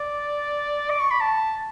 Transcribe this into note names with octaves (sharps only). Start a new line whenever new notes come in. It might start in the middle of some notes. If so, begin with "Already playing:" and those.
Already playing: D5
D6
C#6
B5
A5